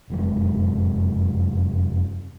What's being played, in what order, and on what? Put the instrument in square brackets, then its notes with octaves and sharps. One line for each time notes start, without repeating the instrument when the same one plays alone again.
[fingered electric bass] F1 F#2 G#3